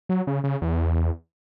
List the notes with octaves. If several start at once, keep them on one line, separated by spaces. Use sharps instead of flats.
F#3
C#3
C#3
E2